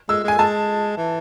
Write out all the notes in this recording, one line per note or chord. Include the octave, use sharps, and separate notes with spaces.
G#3 E6
G#3 G#5
G#3 A5
E3